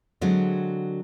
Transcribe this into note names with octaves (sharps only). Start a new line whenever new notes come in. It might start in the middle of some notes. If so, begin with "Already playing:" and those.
D3 F#3 G#3 C4